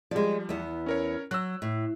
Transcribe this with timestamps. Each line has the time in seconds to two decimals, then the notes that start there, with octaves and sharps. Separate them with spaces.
0.11 F3 G3 G#3 D5
0.49 E2 B3
0.86 C#4 A#4 C#5
1.31 F#3 E6 F#6
1.62 A2